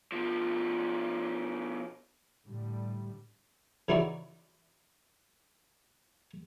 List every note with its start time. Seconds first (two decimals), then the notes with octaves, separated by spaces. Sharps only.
0.12 B2 F3
2.46 A2 D3 G3
3.89 C#3 E3 D#4 E4 F#4 D5